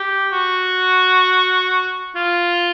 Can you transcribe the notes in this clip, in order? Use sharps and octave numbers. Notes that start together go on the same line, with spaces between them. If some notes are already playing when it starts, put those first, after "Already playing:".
Already playing: G4
F#4
F4